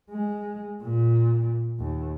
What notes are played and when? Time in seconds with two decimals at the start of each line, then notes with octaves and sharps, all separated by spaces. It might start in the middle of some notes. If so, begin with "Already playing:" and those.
0.10 G#3
0.83 A#2
1.80 D#2